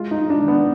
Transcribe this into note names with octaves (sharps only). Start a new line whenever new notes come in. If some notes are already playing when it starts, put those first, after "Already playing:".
Already playing: G#3 F4
D#4
G#3
D4
D#3
B3